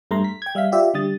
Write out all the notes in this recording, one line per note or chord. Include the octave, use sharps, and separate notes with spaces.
G2 A3 A#5 C6
B6
G5 G#6
G3 E5 F5 B6
F4 G4 D5 E5
D3 G3 D#6 A6